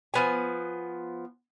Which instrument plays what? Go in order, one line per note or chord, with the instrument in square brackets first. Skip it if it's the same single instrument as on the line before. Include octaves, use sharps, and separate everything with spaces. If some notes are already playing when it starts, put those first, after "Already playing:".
[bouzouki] F3 B3 G#5